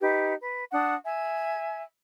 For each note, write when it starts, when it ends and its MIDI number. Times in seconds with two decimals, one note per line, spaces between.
0.01 0.34 63
0.01 0.34 67
0.01 0.34 71
0.42 0.64 71
0.72 0.95 62
0.72 0.95 78
0.72 0.95 87
1.05 1.83 76
1.05 1.83 80